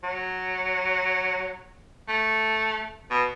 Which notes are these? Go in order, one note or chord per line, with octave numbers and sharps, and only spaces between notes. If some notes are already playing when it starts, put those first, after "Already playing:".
F#3
A3
B2